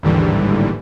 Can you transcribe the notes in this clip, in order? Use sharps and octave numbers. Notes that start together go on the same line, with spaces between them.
A1 D#2 G#2 D3 E3 G3